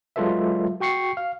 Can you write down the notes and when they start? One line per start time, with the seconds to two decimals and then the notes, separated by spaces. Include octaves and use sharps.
0.16 F#3 G#3 F4 A4 B4 E5
0.80 F#4 G5 C#6 C7 C#7
1.17 F5